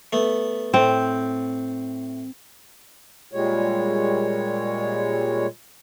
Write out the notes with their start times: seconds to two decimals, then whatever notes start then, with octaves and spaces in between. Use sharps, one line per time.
0.13 A3 B3
0.74 A2 C4
3.32 A#2 G3 G#3 C#5